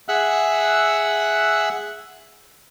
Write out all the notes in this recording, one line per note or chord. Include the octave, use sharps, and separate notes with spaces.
G#4 E5 F#5 E6 F#6